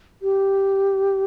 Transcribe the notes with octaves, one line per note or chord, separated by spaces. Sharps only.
G4